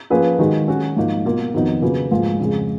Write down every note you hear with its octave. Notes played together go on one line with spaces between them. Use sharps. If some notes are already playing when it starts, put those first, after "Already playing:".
F3 A#3 C#4 G#4 B4
D#3 G#3 D#4 F#4
F#3 C#4 F#4
G#2 F3 A#3 D#4
B2 A#3 F4 A#4
F2 D#3 F#3 B3 D#4
C#3 F#3 A#3 F4 B4
G#2 F3 A#3 F4 G#4
F2 C#3 G#3